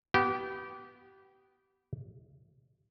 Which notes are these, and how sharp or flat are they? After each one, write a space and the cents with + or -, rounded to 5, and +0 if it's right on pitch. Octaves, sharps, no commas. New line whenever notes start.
B3 +0 G4 -25